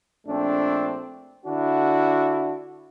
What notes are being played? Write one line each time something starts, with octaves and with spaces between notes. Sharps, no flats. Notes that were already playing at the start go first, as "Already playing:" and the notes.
A#1 A3 C4 D4
D3 D4 E4 F#4